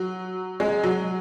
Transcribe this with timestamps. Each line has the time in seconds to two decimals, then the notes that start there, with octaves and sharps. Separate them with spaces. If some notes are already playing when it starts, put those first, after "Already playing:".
Already playing: F#3
0.60 G#3
0.83 F#3